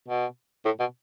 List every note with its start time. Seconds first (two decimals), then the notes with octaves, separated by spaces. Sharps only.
0.08 B2
0.65 A2
0.80 B2